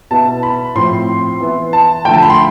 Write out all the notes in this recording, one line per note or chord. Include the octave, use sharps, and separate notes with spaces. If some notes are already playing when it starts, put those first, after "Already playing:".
B2 B3 E4 A5
B5
A2 F3 C4 C6
E3 B3 E4
A5
D3 F3 A3 G5
A5
B5
C6